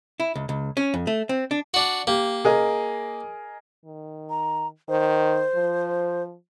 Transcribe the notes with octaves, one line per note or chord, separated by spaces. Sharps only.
E4
C#2
C#2
C#4
F2
A3
C4
D4
D4 F#4
A#3 G4
G#4 A#4 D#5
D#3
A#5
D#3 C5
F3